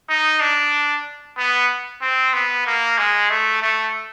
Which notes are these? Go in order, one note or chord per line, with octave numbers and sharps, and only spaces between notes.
D#4
D4
B3
C4
B3
A#3
G#3
A3
A3